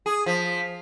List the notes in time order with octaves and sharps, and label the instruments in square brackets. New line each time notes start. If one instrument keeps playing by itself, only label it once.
[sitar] G#4 [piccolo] D#6
[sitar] F3 [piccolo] B6